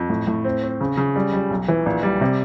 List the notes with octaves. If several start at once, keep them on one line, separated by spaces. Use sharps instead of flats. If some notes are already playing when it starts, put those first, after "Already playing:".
Already playing: F2
A2
A2
C4
C4
C#3
C#3
G3
G3
B1
E3
A#1
G3
C3